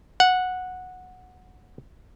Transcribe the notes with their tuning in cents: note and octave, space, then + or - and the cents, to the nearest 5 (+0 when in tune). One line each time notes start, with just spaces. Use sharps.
F#5 -10